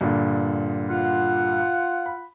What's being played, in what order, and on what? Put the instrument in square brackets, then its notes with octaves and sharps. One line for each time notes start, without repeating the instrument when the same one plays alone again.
[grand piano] G2 A#2 D3
[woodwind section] F4 F#5
[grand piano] B5